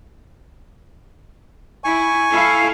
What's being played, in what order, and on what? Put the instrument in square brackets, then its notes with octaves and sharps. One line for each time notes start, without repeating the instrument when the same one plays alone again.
[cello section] E4 [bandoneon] G#5 C#6
[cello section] E4 A4 F5